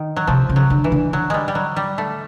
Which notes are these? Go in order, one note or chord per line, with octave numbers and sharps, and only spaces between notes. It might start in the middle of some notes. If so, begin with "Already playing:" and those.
Already playing: D#3
F#3
C3 F3
C#3
F#3
D3
E3
D3
F#3
G3 G#3
G3
F#3
G3
A3